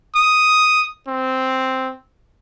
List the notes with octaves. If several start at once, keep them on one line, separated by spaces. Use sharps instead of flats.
D#6
C4